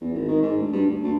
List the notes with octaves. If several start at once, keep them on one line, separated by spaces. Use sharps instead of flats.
E2
G#1
D#3
G#2
D2
G2
D2
D2